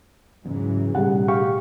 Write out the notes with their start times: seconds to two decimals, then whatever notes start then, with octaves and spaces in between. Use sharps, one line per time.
0.45 E2 G#2 C#3 E3 F#3
0.94 A1 B2 D#3 G3 G#4 F#5
1.28 G4 F5 C#6